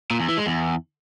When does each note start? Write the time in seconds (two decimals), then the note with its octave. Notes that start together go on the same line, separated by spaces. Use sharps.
0.11 A#2
0.19 E2
0.28 E3
0.37 G#3
0.46 E2